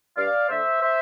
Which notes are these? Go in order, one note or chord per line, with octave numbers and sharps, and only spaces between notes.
G2 D5 F5
D3 A3 C5 E5
C5 E5